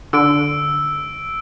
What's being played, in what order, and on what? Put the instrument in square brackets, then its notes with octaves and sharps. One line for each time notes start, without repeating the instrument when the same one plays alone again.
[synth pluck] D3 [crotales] E6 D7